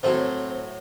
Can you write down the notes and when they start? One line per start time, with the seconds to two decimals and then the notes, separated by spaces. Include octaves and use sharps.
0.03 A2 F#3 A3 C4 C5